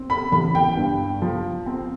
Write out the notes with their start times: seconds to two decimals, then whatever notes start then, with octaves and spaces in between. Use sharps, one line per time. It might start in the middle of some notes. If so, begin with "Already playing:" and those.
Already playing: C4
0.10 B5
0.32 A1 B5
0.55 G5
0.77 G2
1.22 F3
1.66 C4